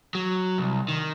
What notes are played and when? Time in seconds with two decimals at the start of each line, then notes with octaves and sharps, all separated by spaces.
0.15 F#3
0.58 C2
0.89 D#3